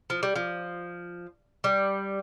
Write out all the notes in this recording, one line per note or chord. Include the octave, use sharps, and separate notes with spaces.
F3
G3
F3
G3